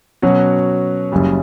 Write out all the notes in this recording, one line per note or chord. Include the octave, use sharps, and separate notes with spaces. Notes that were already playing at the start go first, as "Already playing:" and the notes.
B2 F#3 C#4 F#4
F#1 F#2 C#3 G3